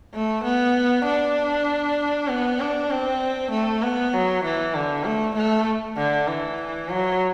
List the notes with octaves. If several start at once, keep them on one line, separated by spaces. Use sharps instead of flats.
A3
B3
D4
B3
D4
C4
A3
B3
F#3
E3
D3
A3
A3
D3
E3
F#3